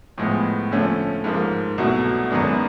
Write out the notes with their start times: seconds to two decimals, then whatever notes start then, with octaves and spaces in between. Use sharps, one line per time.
0.18 A2 F3 G#3 B3
0.71 D3 F3 A3 C#4
1.24 G#2 F3 A#3
1.78 C2 B2 F#3 A3
2.30 F#2 D#3 G#3 B3 D4